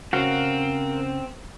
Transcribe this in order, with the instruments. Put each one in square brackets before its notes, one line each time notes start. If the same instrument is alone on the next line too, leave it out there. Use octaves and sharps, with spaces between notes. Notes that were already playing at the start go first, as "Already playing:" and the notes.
[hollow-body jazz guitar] C#3 F#4 [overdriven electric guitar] C4 [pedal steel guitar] A#4 F5 F#5